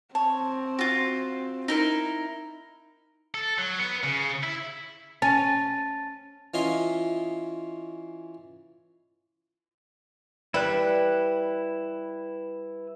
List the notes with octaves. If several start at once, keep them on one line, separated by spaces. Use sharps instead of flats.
C4 C#5 A5
F4 F#4
D#4 E4 A#4
A4
F#3
B3
C#3
E4
C#4 A5 A6
E3 C#4 F4 D#5 B5 C6
G3 E4 B4 F#6